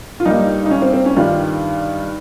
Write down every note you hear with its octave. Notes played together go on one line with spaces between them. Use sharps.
F4
G2 G3 A#3 D#4
D#4
C#4
C4
C4
C#4
G2 D#3 G3 F4